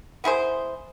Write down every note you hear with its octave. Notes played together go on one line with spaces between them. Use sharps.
B3 E4 G#4 C5